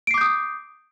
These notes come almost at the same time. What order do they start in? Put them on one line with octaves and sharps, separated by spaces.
D7 C7 D6 G6 D#6